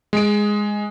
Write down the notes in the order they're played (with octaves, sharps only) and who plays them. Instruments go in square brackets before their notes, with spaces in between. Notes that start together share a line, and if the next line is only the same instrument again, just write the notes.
[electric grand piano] G#3 D7